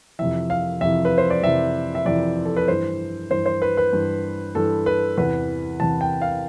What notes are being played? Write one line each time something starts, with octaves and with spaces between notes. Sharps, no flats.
F2 C3 E3 E5
F5
F2 C3 E3 E5
B4
C5
D5
F2 C3 E3 E5
E5
F2 C3 E3 D5
A4
B4
G2 E3 C5
G2 E3 C5
C5
B4
B4
G2 E3
G2 E3 A4
B4
E2 C3 E3 B4
E2 C3 E3 A5
G5
F5